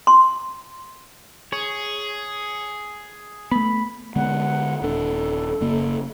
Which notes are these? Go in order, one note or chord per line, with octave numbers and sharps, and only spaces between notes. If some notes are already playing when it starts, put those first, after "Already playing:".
C6
G#4 C#5
A3 B3 B5
D3 G#3 B3 F#5
D#1 D4 A4
F#1 C#3 A#3